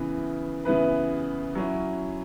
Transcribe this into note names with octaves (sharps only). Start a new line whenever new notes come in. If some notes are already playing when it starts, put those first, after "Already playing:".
Already playing: C#3 E3 B3 E4 B4
C#3 E3 B3 E4 B4
F#3 C#4 E4